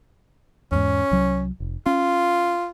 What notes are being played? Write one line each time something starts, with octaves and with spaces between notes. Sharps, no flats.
E2 G#2 C#4
C2 F#3
F1
C#4 F4